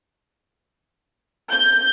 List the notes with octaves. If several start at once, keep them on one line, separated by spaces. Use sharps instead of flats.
G6